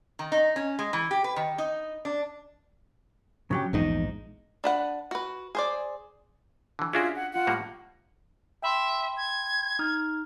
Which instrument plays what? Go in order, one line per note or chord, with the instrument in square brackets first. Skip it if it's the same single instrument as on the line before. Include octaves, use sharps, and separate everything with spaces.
[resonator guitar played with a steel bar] D#3
D#4
C#4
G#3
E3
G4
B4
D#3
D#4
D4
[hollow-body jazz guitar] C#3 F#3 G4
[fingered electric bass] A#1 G#2 [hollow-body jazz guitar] E2 D#4
[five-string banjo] D4 B4 F#5
F#4 B4
G#4 C5 D5
[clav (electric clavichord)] D3 E3
[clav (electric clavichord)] C#4 D4 F#4 [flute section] F4 G#4 E5
[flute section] F#5
F4 F#5
[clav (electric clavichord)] A2 G3 A#3
[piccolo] E5 [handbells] G5 B5 C6
[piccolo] G#6
[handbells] D#4 D#6 F6